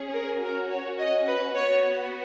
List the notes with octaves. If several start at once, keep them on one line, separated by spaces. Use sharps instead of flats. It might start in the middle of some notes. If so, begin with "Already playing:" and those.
Already playing: C#4 G#4
A#4
C#4 F#4 A#4
C#5
D#5
B4
B3 F#4 C#5